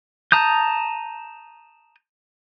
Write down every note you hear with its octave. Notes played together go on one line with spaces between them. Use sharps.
A5 A#5 D#6 G6